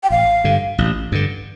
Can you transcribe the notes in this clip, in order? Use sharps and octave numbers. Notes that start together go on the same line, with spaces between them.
G5
A1 F5
G2 D3
A1
G2 D3